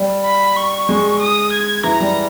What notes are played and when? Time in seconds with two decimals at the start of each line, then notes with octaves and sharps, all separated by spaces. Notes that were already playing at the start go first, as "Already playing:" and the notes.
Already playing: G3
0.25 B5
0.57 C#6
0.89 G#3
1.20 D#6
1.52 G#6
1.83 E3 A#5
2.00 G3